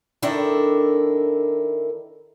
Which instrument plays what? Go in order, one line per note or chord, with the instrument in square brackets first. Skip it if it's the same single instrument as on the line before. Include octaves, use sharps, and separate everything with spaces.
[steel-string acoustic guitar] D#3 D4 E4 A4 A#4